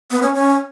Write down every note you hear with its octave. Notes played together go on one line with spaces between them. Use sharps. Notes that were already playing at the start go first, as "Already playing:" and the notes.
B3
C#4
C#4